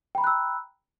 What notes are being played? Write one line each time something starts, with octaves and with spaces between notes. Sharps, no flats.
G5 A#5 B5 E6 F#6